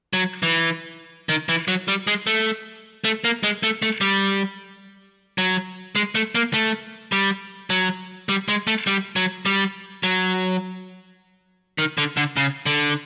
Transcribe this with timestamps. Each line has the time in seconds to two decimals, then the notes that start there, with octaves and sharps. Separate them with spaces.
0.13 F#3
0.43 E3
1.29 D#3
1.49 E3
1.68 F#3
1.88 G3
2.07 G#3
2.27 A3
3.04 A3
3.24 A#3
3.43 G#3
3.63 A3
3.82 A3
4.01 G3
5.38 F#3
5.95 G#3
6.15 A3
6.35 A#3
6.54 A3
7.12 G3
7.70 F#3
8.29 G3
8.48 G#3
8.67 A3
8.87 G3
9.16 F#3
9.46 G3
10.03 F#3
11.78 D#3
11.98 D3
12.17 D3
12.37 C#3
12.66 D3